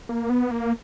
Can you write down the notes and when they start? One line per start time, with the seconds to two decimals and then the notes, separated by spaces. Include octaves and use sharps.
0.09 A#3
0.30 B3
0.51 A#3